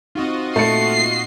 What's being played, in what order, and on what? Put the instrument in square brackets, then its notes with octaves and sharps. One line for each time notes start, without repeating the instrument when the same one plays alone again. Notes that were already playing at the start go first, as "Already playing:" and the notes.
[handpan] C4 D#4 [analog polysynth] F4 F#4 D#5
[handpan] A#2 [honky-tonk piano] A3 C#7 [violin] C7